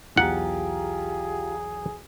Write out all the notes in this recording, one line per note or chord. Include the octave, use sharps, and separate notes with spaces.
B1 E2 F4 G4 G#4 F#5 A#5